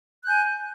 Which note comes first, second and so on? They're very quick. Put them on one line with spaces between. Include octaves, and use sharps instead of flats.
F#6 G6 G#5